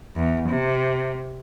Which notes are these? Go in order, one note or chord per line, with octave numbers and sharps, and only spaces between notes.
E2
C3